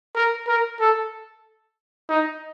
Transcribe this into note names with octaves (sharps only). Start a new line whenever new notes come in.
A#4
A#4
A4
D#4